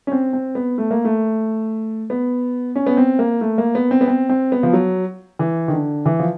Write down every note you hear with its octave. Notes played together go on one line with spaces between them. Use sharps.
C#4
C4
C4
B3
A3
A#3
A3
B3
C#4
B3
C4
A#3
A3
A#3
B3
C4
B3
C4
C4
B3
F3
F#3
E3
D#3
D3
E3
F3